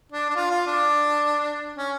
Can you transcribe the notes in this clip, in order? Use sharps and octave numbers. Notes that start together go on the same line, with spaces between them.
D4
D4
F4
F4
D4
C#4